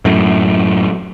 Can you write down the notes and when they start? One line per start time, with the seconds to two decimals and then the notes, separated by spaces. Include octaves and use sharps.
0.05 F#2 A2